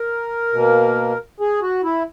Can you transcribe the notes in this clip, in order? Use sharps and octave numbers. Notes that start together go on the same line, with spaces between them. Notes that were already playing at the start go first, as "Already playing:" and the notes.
Already playing: A#4
B2 A#3
G#4
F#4
E4